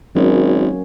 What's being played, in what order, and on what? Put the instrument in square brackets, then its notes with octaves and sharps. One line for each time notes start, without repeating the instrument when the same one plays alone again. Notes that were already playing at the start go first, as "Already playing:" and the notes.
[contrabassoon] G#1 [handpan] F#3 A#3 C#4